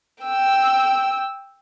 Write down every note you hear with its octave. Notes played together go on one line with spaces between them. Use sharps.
G5 E6